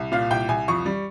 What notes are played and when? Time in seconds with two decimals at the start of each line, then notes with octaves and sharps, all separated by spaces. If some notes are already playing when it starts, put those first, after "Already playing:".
Already playing: C2
0.12 A#2 F5
0.30 C2 G5
0.49 C2 G#5
0.68 F2 C#6
0.86 G3